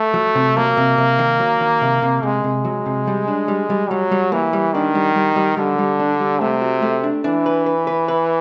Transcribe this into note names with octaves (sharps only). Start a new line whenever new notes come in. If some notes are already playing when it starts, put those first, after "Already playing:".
Already playing: A3
F#3
C3
F#3 A#3
C3
C3
D#3
F#3
D#3
C3
C3
C3 G#3
C3
F#3
C3
G3
D4
G3
G3
F#3 G3
G3
E3 A#3
G3
D#3 D4
G3
G3
G3
D3 G3
G3
D4
G3
C3 A3
F#4
A3
D4
E3 D4
B4
B4
B4
B4